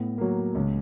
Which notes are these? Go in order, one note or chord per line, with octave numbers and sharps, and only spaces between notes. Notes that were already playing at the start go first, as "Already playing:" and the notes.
Already playing: A2 B3
F#3 A#3
C#2